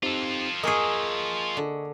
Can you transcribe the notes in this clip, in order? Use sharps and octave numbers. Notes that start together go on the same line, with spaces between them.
C4 D#4 F4 G4 A4
A#3 G#4 D#5 G#5 C#6
D3